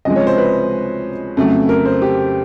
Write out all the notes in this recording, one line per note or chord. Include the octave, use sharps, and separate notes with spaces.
C#2 C3 F3 G#3 D#5
C#5
C5
B4
F2 C#3 F#3 A3
A#4
C5
G4